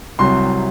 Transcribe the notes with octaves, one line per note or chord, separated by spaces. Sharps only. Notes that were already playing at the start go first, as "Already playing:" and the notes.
C2 C3 F#3 C6